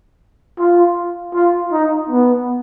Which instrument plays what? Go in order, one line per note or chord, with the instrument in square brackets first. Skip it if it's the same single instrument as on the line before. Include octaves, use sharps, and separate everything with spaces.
[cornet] F4
F4
D#4
B3